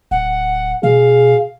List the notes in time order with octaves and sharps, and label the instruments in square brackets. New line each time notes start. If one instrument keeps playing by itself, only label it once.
[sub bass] D1 [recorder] F#5
[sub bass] B2 [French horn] G#4 [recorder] F5